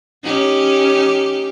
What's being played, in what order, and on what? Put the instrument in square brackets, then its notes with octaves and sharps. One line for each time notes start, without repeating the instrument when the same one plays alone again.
[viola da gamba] C#4 D#4 G4